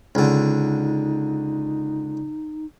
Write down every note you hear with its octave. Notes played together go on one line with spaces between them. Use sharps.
C#2 D3 D#4